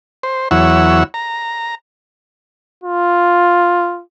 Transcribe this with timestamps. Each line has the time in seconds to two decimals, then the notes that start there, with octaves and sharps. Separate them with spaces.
0.23 C5
0.51 E2 F#3 E4 C#5 F#5 E6
1.14 A#5
2.84 F4